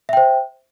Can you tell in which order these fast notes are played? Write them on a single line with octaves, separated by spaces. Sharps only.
E5 G5 C5